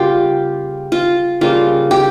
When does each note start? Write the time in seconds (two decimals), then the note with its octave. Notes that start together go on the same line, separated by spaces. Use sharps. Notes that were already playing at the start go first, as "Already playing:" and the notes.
Already playing: C#3 G3 A#3 F4 G4
0.92 F4
1.41 C#3 G3 A#3 F4
1.91 G4